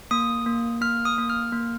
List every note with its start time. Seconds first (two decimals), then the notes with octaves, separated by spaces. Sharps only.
0.11 A#3 D#6
0.46 A#3
0.81 A#3 F6
1.05 D#6
1.18 A#3
1.30 F6
1.52 A#3